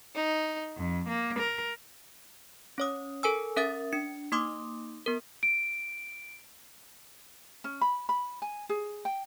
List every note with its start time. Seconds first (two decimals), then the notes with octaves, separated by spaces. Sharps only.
0.14 D#4
0.77 F2
1.08 A#3
1.39 A#4
2.78 C#4 C#5 D#6
3.23 A4 A#4 G#5 E6
3.56 C#4 A#4 E5 D#6 A6
3.93 D4 C#7
4.32 A#3 D#4 C6 D6 D#6
5.06 B3 A#4
5.43 D7
7.64 C#4
7.81 B5
8.09 B5
8.42 G#5
8.69 G#4
9.05 G5